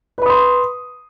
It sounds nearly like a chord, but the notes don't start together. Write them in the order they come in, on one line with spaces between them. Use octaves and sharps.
B4 B5 D#6 C6